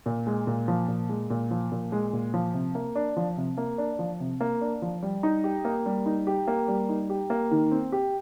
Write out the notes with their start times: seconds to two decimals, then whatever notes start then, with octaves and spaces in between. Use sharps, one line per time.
0.06 A#2
0.27 G#3
0.47 A#2
0.68 F3
0.88 A#2
1.09 G#3
1.30 A#2
1.51 F3
1.72 A#2
1.92 G#3
2.13 A#2
2.34 F3
2.54 C3
2.75 A#3
2.96 D4
3.17 F3
3.37 C3
3.57 A#3
3.78 D4
3.99 F3
4.20 C3
4.41 A#3
4.61 D4
4.82 F3
5.03 G3
5.23 D#4
5.44 G4
5.65 A#3
5.86 G3
6.06 D#4
6.27 G4
6.47 A#3
6.68 G3
6.89 D#4
7.10 G4
7.30 A#3
7.51 D#3
7.71 C4
7.92 G4